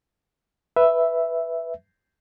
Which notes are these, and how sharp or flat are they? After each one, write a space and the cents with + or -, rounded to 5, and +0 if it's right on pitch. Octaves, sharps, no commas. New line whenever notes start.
B4 +0 E5 +0